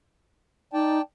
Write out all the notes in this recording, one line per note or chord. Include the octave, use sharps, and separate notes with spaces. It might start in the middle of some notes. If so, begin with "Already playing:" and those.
D#4 D5 G5 A5